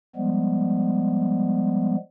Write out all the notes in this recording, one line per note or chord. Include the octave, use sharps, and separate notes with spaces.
F3 G3 G#3 B3